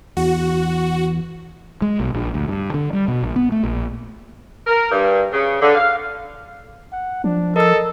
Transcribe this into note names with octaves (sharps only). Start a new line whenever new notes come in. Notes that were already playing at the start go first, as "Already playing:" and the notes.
E2 F#4
G#3
B1
A#1
D2
G2
D3
G3
B2
A#1
B3
A3
A#1
A#4
G2
C#3
D3
F5
F#5
F3 D4
A4 A#4 D#5 E6